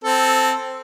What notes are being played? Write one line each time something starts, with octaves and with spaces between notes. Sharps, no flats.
C4 A4